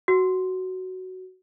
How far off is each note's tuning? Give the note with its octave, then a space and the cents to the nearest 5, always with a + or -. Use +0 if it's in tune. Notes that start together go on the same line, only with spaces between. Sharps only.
F#4 +10